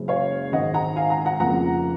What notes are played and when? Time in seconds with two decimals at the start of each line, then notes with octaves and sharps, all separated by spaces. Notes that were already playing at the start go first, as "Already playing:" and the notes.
Already playing: F#1 F#2 C#3 G#3
0.08 C#5 F5
0.52 G#1 G#2 D#3 D#5 F#5
0.74 F#5 A#5
0.96 F5 G#5
1.10 F#5 A#5
1.25 F#5 A#5
1.40 F1 F2 C#3 F3 A#3 F#5 A#5